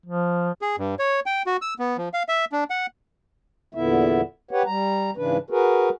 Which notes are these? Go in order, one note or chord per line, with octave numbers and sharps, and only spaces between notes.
F3
G#4
G2
C#5
G5
F#4
E6
B3
F3
F5
E5
D4
F#5
E2 A#2 D3 B3 E4 E5
G4 B4 C#5 F#5
G3 A#5
G#2 C#3 E3 D4 B4
F#4 G#4 A#4 B4